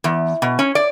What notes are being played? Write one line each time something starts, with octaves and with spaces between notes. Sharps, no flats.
E2
B2
C#4
D5